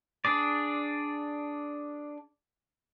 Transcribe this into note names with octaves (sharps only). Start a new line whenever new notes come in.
D4 G#4 D5